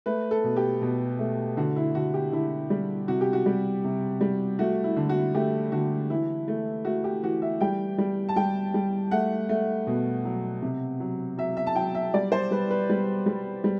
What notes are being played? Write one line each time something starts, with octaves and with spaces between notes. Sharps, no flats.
A3 B4
A4
B2
G4
B2
A3
D3 F#4
E4
D3 F#4
G4
D3 E4
G3
C3 F#4
G4
F#4
G3
C3
G3
A3 F#4
E4
D3
F#4
A3 G4
D3 F#4
E3 E4
A3
A3 F#4
G4
E3 F#4
E5
G3 G5
G3
A5
G3 G5
G3
A3 F#5
A3
B2
F#3
C3
F#3
F#3 E5
E5
A5
F#3 G5
E5
G3 D5
C5
G3 B4
B4
G3
G3
G3